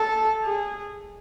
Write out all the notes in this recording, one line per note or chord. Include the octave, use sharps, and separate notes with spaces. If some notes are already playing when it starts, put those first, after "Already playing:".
Already playing: A4
G#4